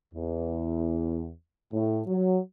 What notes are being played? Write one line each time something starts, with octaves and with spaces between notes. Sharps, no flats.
E2
A2
F#3